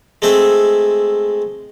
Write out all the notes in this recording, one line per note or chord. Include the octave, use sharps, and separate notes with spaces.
G#3 A3 C4 G#4 E5